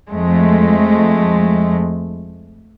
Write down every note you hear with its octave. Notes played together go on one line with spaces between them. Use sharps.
F2 G#3 A3